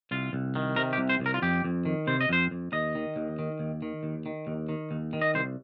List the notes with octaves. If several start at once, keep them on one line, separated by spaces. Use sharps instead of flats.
C2 F4
C2
D#3
C3 A#4
G4
C2
C5
C2
A#4
F4
F2 G4
F2
D#3
C3 C5
D#5
F2 C5
F2
D#2 D#5
D#3
D#2
D#3
D#2
D#3
D#2
D#3
D#2
D#3
D#2
D#3
D#5
C2 C5